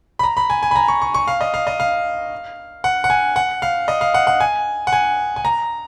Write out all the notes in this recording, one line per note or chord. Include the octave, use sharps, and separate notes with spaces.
B5
A#5
B5
G#5
G#5
B5
A#5
C#6
C#6
C#6
F5
D#5
F5
D#5
F5
F#5
F#5
G#5
F#5
F5
D#5
F5
F#5
F#5
G#5
F#5
G#5
G#5
A#5